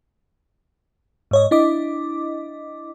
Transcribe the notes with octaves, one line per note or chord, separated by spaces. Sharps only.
G#2 C#5 D#5
D4 E4 D#5 D6